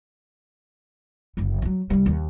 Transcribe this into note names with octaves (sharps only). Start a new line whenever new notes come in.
F#1 D3
F#3 G#3
C2 G3
D#2